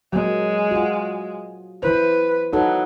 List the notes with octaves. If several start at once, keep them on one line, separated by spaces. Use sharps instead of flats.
F#3 G#3 A#3
F4 F#4
E3 E4 B4 C5
F#3 D#4 A4 B4